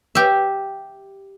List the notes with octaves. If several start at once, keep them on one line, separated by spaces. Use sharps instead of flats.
G4 E5